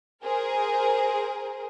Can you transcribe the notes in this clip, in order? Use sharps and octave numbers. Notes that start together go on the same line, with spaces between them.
G#4 A#4 C5